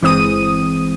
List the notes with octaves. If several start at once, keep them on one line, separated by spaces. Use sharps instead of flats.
G1 E3 G#3 C4 D#6 D#7